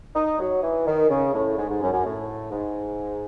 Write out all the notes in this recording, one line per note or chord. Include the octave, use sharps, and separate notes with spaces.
D#4
F#3
E3
D#3
C#3
A2
G#2
G#2
F#2
F#2
A2
G#2